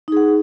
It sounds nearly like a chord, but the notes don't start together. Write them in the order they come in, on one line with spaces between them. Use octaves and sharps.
D#4 G#4 F#5